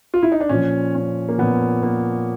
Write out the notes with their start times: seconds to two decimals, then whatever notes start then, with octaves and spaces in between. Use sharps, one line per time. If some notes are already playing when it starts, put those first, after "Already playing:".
0.14 F4
0.23 E4
0.32 D#4
0.40 D4
0.49 A#2 F3 C#4
0.95 C#4
1.29 A#3
1.38 A#2 F3 B3
1.83 A#3